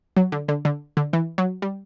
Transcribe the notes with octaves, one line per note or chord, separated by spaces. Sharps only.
F#3
D3
D3
D3
D3
E3
F#3
G3